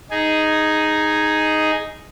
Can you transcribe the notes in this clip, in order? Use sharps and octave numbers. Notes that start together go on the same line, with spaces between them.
D#4 G#4